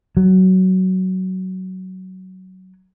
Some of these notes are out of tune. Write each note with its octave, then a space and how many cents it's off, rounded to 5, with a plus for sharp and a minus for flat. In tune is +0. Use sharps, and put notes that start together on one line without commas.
F#3 +15